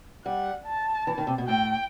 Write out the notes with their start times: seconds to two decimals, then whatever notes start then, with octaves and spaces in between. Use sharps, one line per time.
0.25 G3 F#5
0.66 A5
1.07 E3
1.18 D#3
1.27 C3
1.38 B2
1.48 A2 G5